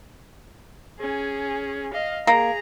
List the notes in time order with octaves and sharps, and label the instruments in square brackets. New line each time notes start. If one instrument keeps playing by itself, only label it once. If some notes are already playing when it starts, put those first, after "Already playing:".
[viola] C#4 G#4
D#5 F5
[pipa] A#3 [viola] G#4 A#5